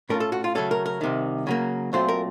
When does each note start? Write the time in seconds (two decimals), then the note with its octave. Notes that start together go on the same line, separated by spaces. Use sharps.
0.09 A2 A3 C#4 F4 A#4
0.20 A4
0.32 F#4
0.44 F4
0.55 C#3 F#3 A3 C#4 A4
0.71 A#4
0.86 A#4
1.01 C2 C3 D#3
1.47 C#3 F#3 A#3
1.93 A#2 F#3 A3 C4 F4 C5
2.08 A#4